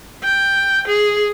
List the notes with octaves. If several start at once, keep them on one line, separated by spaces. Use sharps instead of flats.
G5
G#4